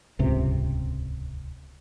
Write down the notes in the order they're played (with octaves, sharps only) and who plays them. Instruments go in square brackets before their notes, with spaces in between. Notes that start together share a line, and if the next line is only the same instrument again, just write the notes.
[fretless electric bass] D#1 C#2 G#2 C3